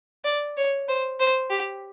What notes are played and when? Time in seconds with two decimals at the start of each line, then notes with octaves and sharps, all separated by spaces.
0.25 D5
0.57 C#5
0.88 C5
1.20 C5
1.50 G4